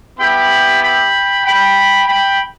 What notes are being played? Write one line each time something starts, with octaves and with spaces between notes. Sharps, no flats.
B3 E4 G4 G5 B5
G5 B5
G5 B5
G5 B5